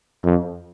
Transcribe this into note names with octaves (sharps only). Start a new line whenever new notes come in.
F2